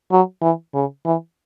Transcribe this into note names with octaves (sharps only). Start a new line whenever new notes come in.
F#3
E3
C#3
E3